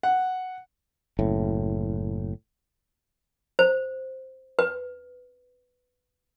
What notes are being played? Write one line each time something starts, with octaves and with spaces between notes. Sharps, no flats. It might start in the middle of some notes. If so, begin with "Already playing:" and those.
F#5
F#1 A2
C5
B4